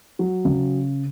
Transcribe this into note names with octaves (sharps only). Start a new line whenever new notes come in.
F#3
C#3